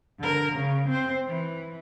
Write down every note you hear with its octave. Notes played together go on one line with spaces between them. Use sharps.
D3 A#4
C#3
C4 C5
E3